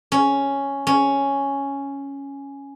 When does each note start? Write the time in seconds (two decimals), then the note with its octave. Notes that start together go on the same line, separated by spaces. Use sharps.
0.12 C#4
0.87 C#4